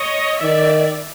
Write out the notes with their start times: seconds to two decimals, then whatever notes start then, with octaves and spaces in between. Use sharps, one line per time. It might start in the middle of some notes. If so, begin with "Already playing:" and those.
Already playing: C#5 D#5
0.41 D#3 D5 E5